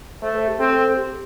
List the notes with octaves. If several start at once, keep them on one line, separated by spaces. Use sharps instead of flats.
A3 C5
A4
G4
C4 A4
G4